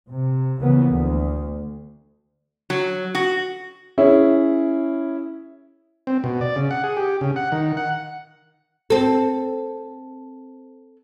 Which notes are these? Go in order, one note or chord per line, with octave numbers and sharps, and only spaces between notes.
C3
C#3 E3 F3 A#3 B3
D2
F#3
F#4
C#4 E4 G#4 C#5
C4
B2
D5
C#3
F#5
G#4
G4
C#3
F#5
D#3
F#5
C4 A4